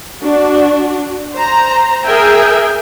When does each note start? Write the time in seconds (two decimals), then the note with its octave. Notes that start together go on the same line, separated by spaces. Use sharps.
0.22 D4 F#4
1.35 C5 A#5
2.06 G#4 A#4 E5 G5 G#5